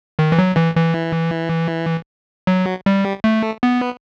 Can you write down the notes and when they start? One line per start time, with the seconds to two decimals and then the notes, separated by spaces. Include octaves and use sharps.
0.19 D#3
0.32 E3
0.39 F#3
0.57 E3
0.76 E3
2.47 F#3
2.86 G3
3.24 A3
3.63 B3